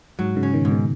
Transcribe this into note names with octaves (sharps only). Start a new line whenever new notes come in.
G#2 F#3
G#2 C#3
C#4
B2 D#3
G#2
B2 D#3